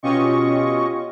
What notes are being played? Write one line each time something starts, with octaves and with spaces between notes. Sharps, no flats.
B2 C#4 F4 G4 D#5 C#6